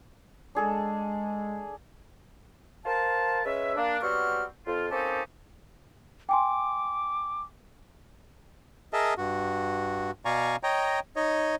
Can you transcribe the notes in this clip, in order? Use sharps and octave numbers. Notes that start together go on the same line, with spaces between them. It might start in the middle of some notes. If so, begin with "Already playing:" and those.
G#3 D4 G#4 A4
A#4 C5 F5 A5
G#3 C#4 B4 E5
A#3 D4
F#3 G3 B3 C4 C#6 F6
F2 F4
A#3 C4 C#4 D#4 G4 A4
G5 G#5 C6 D6
G#4 A#4 D#5 E5 A5
G2 F#4
B2 D5 F5 G#5 A#5 C#6
C#5 D#5 G5 A#5
D#4 C#5 D#5